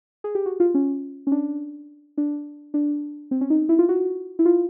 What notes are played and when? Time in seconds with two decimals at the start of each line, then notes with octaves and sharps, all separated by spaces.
0.24 G#4
0.35 G4
0.46 F#4
0.60 F4
0.74 C#4
1.27 C#4
1.32 D4
2.18 D4
2.74 D4
3.31 C4
3.41 C#4
3.50 D#4
3.69 E4
3.79 F4
3.89 F#4
4.39 E4
4.45 F4